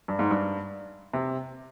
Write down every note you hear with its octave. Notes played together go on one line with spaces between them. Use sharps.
G2
G#2
G2
C3